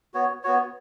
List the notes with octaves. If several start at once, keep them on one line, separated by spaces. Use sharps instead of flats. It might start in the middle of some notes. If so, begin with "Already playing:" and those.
B3 F#4 C#5
B3 F#4 C#5